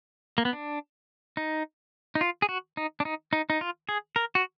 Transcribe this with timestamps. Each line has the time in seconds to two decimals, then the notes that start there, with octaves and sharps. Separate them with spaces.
0.38 A#3
0.45 B3
0.53 D4
1.37 D#4
2.15 D#4
2.21 F4
2.42 G#4
2.49 F#4
2.77 D#4
3.00 D4
3.05 D#4
3.33 D#4
3.50 D#4
3.61 F4
3.89 G#4
4.16 A#4
4.35 F#4